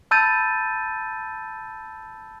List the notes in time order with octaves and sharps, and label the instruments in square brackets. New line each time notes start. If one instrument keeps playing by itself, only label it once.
[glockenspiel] A5 B5 E6 G6 A6 D#7